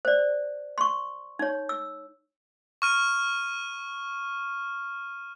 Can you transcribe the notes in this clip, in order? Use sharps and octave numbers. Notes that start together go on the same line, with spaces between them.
C5 D5
C6 C#6
D#4 C#5
E6
C#6 F6 D#7